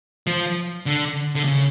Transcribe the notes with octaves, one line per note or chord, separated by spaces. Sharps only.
F3
D3
D3
C#3